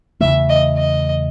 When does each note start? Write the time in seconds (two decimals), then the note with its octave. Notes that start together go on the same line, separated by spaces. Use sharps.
0.20 E2 C#3 E3 A3 E5
0.49 D#5
0.77 D#5